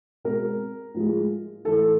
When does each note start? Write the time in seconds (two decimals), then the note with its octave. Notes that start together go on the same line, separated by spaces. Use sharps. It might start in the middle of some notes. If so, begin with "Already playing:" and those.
0.24 B2 G#3 C4 A#4
0.95 A2 F3 G#3
1.65 A2 E3 A3 A4